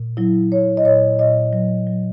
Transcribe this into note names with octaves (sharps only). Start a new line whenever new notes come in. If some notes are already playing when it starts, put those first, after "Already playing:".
Already playing: A#2
F#3 E4
F#3 C#5
D#5
A#2 C#5
A#2 D#5
F#3
F#3